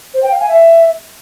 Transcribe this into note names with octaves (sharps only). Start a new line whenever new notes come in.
C5
G5
F5
G#5
E5